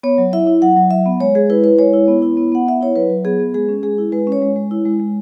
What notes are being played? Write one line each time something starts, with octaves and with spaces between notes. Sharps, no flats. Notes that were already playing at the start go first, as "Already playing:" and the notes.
B3 C#5
F#3
E4 E5
E4
F#3 F#5
F#3
F#3 E5
B3
G#3 C#5
G#3 G#4
E4 B4
E4 B4
G#3 C#5
E4
B3
E4
B3
B3 F#5
B3 E5
E4 C#5
F#3 B4
F#3
B3 G#4
B3
G#3 G#4
C#4
G#3 G#4
E4
G#3 B4
C#4
C#5
G#3
G#3
E4
G#3
G#3